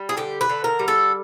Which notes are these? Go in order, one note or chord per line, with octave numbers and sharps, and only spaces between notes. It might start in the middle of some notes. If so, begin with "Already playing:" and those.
Already playing: G3
G#4
D3 G4
B4
D3
A#4
G3
A4